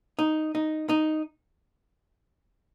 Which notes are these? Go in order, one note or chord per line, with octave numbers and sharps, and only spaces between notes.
D#4
D#4
D#4